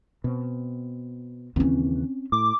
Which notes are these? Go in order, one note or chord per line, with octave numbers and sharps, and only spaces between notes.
B2 C4
D#2 C#3 E3 C4 C#4
A2 D6